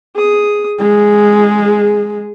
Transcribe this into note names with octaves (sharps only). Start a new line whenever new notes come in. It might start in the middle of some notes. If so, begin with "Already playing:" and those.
G#4 D#6
G#3 G#4